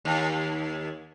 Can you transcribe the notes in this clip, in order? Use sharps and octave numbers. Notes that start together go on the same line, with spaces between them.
D#2